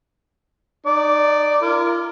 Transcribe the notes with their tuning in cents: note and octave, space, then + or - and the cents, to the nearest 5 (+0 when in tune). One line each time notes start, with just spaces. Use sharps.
D#4 -25 D5 +0
F4 -40 A#4 +0